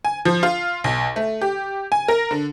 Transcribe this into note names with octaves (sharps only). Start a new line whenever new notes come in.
G#5
F3
F4
B1
A3
G4
G#5
A#4
D3